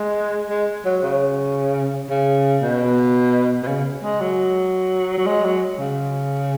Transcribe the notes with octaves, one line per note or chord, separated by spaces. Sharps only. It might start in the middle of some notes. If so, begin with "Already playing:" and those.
Already playing: G#3
G#3
F#3
C#3
C#3
B2
B2
C#3
G#3
F#3
F#3
G#3
F#3
C#3